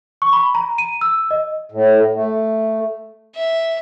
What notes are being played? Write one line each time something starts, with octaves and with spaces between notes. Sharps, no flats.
C#6
B5
A#5
D#7
E6
D#5
A2
A3
E5